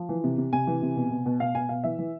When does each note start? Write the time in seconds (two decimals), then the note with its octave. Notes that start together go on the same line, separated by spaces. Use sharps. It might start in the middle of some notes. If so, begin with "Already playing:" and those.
Already playing: F3
0.09 E3
0.24 C3
0.38 C3
0.53 C3 G#5
0.67 E3
0.82 C3
0.96 B2
1.11 B2
1.26 B2
1.40 B2 F5
1.55 B2 G#5
1.69 B2 F5
1.84 E3 E5
1.99 E3